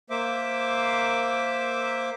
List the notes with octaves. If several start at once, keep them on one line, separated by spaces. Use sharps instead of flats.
A#3 C5 E5 D6